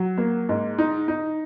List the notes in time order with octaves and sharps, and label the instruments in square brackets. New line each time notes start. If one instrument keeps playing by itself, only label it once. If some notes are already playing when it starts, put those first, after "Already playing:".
Already playing: [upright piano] F#3
A#3
G#2
D#4
D#4